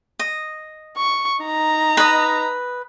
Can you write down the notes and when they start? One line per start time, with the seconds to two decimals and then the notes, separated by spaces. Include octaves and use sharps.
0.19 D#5
0.97 C#6
1.43 D#4 A#5
1.97 B4 D#5